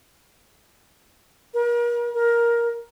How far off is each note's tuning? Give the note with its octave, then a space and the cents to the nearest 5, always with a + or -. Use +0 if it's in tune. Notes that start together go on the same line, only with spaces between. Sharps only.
A#4 +35
A#4 +10